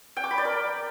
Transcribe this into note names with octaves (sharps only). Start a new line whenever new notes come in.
G5
D6
B5
D5
A#4